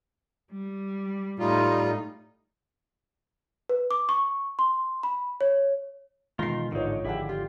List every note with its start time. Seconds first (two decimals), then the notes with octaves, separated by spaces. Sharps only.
0.52 G3
1.39 A2 G3 D#4 F4
3.69 B4
3.91 D6
4.09 C#6
4.59 C6
5.03 B5
5.41 C#5
6.39 B2 D#3 E3 G#3 F4 A#6 C7
6.72 A1 G#2 D3 D#4 F4 C#5
7.05 G#1 D3 F3 E4 G4 G#4 F5 F#5
7.29 F4 G4